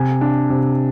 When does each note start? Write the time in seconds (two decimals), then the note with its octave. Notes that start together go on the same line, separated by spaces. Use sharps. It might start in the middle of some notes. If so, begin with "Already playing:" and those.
Already playing: C3 G#5
0.21 D4
0.50 C3